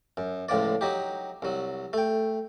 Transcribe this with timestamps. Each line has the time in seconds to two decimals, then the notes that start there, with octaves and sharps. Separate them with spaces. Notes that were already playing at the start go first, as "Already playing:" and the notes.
0.17 F#2
0.49 C#2 A2 F3 D5
0.81 F#3 D#4 G4
1.42 C2 F#3
1.93 A3 G5